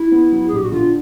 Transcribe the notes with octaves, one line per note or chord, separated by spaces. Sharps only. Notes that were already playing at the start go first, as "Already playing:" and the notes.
Already playing: E4
B3
F#3
G#4
A#1 G4
F#4
D3 F4